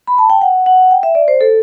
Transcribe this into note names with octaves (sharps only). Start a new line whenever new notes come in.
B5
A5
G5
F#5
F#5
G5
E5
D5
C5
A4